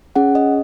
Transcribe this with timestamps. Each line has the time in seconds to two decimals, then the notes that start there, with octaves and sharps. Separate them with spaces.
0.16 C#4 G#4 F#5
0.35 D#5